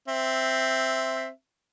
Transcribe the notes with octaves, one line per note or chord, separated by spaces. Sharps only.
C4 E5